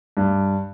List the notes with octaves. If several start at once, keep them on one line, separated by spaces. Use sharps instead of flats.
G2